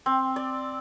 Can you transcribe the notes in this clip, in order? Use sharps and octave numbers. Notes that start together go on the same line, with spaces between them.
C4
D5